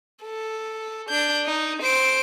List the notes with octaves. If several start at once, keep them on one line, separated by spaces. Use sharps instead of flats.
A4
D4 G6
D#4
C5 D7